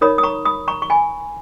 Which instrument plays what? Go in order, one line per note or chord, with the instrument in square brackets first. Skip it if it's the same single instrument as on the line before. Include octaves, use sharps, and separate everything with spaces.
[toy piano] D#4 A#4 C#5 B5 D#6
D#6
A#5 C#6
B5 D#6
A#5 C#6
C#6
G#5 B5